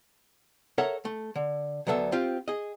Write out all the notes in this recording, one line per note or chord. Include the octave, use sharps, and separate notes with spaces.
A4 A#4 C#5 E5 F#5 A#5
A3
D3
D2 F#3 B3 A4 E5
C4 F4 G4
G#4 D#5